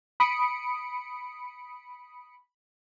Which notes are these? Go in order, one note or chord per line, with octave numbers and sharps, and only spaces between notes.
B5 D#6 C#7 D7